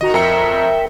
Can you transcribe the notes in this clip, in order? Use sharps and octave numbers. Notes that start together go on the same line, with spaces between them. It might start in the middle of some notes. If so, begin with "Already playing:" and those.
D#3 F#4 D#5 A#5
F2 A#4 E5 G5 A#5 C#7